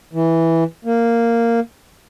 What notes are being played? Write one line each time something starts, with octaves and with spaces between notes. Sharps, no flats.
E3
A#3